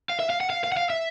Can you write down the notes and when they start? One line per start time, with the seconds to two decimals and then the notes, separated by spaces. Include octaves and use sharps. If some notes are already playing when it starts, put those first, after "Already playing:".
0.10 F5
0.20 E5
0.30 F5
0.40 F#5
0.50 F5
0.64 F5
0.72 F#5
0.77 F5
0.90 E5